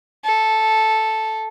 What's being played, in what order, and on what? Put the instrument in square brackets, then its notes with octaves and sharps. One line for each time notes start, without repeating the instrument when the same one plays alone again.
[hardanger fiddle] A4